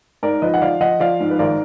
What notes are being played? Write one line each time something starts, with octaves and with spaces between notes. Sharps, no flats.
G#2 A#4 D5
F3 B4 D#5
F#5
F3 D5 F5
F3 D#5 F#5
F3 D5 F5
G#2
B4
G#1 A#4 D5